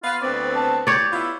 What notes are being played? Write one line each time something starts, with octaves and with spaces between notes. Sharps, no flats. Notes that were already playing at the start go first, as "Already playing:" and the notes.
B3 F4 B4 F5
D2 B3 C4 D5
A5
G4 C#5 D5
B3 E4 F4